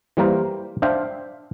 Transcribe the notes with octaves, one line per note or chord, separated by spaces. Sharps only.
E3 G3 A#3 A#4 C5
D4 C5 E5 F5 G5